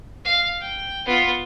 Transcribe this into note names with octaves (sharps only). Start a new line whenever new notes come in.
F5
G5
B3 F4